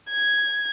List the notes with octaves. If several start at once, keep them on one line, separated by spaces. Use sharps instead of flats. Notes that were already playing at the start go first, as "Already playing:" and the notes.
G#6